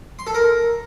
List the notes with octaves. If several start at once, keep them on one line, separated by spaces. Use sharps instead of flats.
C6
A4
A#4